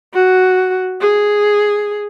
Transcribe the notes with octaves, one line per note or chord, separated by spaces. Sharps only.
F#4
G#4